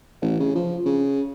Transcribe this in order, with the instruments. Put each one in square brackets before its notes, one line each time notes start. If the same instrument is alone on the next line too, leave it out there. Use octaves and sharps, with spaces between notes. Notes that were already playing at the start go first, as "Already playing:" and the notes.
[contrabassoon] A1
C#3
F3
C#3